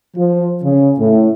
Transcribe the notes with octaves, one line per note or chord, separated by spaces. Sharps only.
F3
C#3
A2